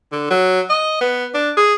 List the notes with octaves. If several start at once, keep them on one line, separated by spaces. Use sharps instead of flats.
D3
F#3
D#5
B3
D4
G#4